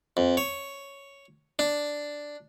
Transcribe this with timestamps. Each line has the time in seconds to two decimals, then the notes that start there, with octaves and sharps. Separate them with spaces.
0.17 F2
0.37 C#5
1.59 D4